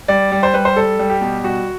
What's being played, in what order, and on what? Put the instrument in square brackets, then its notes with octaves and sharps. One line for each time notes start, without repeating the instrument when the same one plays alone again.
[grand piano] G3 D5
G3
C5
G3 B4
C5
G3 A4
G3
G4
B2
G3 F#4